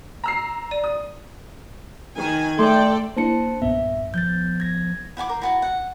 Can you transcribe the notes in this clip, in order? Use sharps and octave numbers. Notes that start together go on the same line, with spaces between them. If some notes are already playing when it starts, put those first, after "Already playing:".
A#5 E6 C7
D5 D#7
D#6
D#3 G#5
A3 A4 D5 G5 C6
A#3 D4 E4 C5 A5 C#7
B1 G2 A#2 B3 E5
F3 G6 A6
G#6 A#6
E4 F#5 G#5 D6
A#4 C5
E4 F#4 A5
F#5